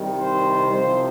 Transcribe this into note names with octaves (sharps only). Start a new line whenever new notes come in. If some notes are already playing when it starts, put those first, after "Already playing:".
Already playing: C2 C3 D#3 G3
C5
C2 C3 F3 C5